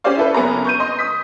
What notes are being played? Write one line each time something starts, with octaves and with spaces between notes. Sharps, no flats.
C#4 G4 G#4 C5 D5 F5
E4 A4 B4
F#1 A#3 B3 G#4 A#5
C#6 G6 D#7
D#5 C6
D#6 B6